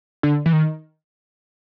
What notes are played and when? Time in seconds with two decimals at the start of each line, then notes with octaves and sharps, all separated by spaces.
0.23 D3
0.46 E3
0.53 D#3